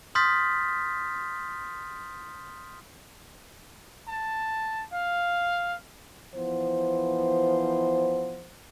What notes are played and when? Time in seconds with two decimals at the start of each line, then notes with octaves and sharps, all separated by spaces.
0.15 C6 D#6 F6 G6 A6 B6
4.09 A5
4.93 F5
6.35 E3 F3 B3 C5